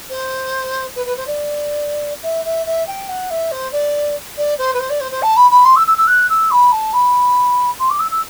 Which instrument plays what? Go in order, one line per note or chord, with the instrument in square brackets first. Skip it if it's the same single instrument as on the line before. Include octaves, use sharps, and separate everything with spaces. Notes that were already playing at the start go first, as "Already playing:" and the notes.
[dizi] C5
B4
B4
C5
D5
E5
E5
E5
G5
F#5
E5
C5
D5
D5
C5
B4
C5
D5
C5
C5
A5
B5
B5
C6
E6
E6
E6
F#6
E6
B5
A5
B5
C6
D6
E6
E6